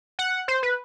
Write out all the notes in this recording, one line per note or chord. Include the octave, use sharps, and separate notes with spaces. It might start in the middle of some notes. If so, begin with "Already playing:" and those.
F#5
C5
B4